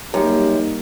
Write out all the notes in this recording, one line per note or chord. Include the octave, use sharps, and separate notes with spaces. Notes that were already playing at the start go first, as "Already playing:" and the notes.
F#2 G3 A#3 D#4 G4